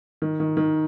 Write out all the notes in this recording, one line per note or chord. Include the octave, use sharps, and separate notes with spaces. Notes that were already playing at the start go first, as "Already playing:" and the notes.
D#3
D#3
D#3